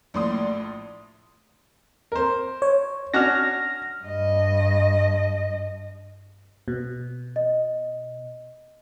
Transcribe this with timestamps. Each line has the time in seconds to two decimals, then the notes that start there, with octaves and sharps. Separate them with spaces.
0.14 A#1 A2 D5 C6 D#6
2.12 A#4 C5
2.62 C#5
3.14 C#4 D4 F#4 F6 A#6
4.04 G2 D#5
6.68 B2
7.36 D#5